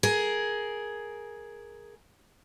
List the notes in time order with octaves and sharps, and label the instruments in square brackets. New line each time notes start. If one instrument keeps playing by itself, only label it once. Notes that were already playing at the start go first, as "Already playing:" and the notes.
[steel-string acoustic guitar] G#4 A#4